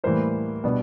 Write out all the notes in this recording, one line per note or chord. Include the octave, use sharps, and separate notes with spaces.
A2 E3 G3 A#3 C5
B2 G3 B3 D4